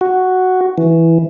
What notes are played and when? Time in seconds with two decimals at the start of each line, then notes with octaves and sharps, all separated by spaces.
0.01 F#4
0.78 E3